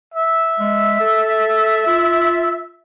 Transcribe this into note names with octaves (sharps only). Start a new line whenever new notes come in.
E5
G#3
A4
F4